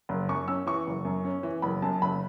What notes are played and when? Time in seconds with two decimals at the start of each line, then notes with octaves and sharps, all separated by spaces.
0.09 F#1
0.29 F#2 C#6
0.48 C#4 E6
0.66 E3 C#6
0.87 F#1
1.05 F#2
1.25 C#4
1.43 E3
1.62 F#1 B5
1.82 F#2 A5
2.02 F#1 B5